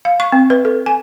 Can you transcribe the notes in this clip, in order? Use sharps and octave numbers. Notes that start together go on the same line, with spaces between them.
F5
C#6
C4
B4
A4
G#5